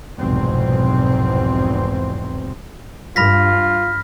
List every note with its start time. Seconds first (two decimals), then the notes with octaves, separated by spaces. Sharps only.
0.19 F1 B1 E2 G#2 C4
3.16 G2 F4 B5 F6 A#6 B6